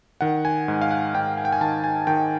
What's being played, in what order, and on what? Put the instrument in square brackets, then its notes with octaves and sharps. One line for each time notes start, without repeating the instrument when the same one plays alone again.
[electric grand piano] D#3 F#5
G#5
G#2
F5
F#5
G#2 G5
G#5
G5
G#5
D#3 A5
G#5
D#3 G5